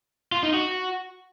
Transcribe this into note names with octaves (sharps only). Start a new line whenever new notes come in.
F4
D#4
F#4